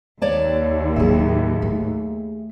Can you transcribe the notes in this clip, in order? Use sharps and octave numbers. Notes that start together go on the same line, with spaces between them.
D#2 C#5 D5 A5
A2 F#3 G#4 E5
A3